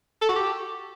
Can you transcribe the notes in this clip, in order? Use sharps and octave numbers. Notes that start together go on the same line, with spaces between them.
A4
F#4
G4